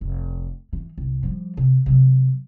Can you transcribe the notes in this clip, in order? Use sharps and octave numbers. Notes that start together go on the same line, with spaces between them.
F1
E3
C2
F3 G3
C3
C3 F#3